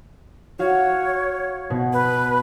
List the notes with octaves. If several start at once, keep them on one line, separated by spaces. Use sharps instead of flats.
F#4 C#5 F5
B2
B4